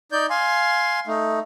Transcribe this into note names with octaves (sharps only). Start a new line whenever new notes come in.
D#4 D5 G6
F5 G#5 C6
A3 D#4